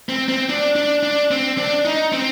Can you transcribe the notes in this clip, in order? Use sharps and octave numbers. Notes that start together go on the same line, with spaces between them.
C4
C4
D4
D4
D4
C4
D4
D#4
C4